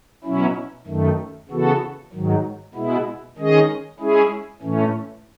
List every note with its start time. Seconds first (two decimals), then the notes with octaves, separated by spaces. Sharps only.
0.24 B2 F#3 C#4 E4
0.87 F#2 D#3 A3
1.49 C#3 E3 B3 F#4 A4
2.13 G#2 D#3 F#3
2.75 B2 G#3 B3 E4
3.37 D#3 G#3 C#4 G#4 D#5
4.00 G#3 C#4 E4 G#4
4.62 A2 E3 A3 C#4